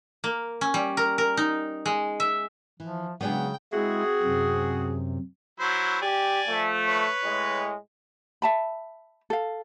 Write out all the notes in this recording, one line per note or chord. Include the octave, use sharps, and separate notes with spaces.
A#3
C#4
G3
A#4
A#4
D#4
G#3
E5
E3 F3
C#3 F#3 G#3 B3 D4 G#4 G5
G#3 C4 E4 F#4 G#4
F#2 C3
F#3 E4 C5
G4 D5 G#5
F3 A3
B4 C#5
A2 G#3
E5 A5 B5
A4 F5